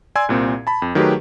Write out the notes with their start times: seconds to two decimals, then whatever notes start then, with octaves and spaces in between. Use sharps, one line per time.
0.15 D5 G#5 C6 E6 G#6
0.29 C2 A#2 C4
0.67 A5 B5
0.82 F2
0.95 D#3 F#3 A3 G4 G#4 B4